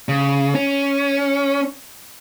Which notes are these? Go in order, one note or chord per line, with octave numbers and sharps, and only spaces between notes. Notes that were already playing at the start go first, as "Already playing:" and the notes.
C#3
C#4